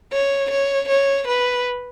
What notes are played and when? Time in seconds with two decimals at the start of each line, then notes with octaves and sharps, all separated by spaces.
0.13 C#5
0.51 C#5
0.88 C#5
1.27 B4